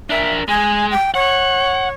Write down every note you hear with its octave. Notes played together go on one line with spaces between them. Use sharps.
D4 A#4 E5
G#3 G#5
G5
C#5 F#5